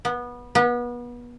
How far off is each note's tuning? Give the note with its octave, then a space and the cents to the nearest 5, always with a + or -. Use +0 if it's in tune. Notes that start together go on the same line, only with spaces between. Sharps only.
B3 -20
B3 -30